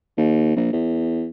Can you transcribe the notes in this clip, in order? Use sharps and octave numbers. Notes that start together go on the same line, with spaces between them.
D#2
A#1
E2